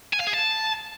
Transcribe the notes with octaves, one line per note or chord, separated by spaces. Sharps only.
G#5
F5
G#4
A5